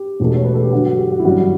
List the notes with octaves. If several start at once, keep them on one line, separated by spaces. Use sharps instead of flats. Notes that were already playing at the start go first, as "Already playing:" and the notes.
Already playing: G4
E1 E2 B2 A3
C#5
B4
A4
G4
G1 G2 F#3 F#4
F#4
G4
F#4
E4
G1 F#2 E3 G3 F#4